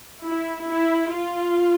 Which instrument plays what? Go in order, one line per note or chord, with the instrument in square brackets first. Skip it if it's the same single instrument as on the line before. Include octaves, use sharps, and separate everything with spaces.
[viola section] E4
E4
F4